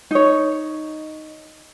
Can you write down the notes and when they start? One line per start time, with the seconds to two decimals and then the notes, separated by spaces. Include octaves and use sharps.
0.11 D#4 C#5